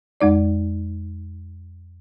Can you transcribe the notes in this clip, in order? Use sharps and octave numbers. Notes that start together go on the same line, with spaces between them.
F2 G#3 D#4 D5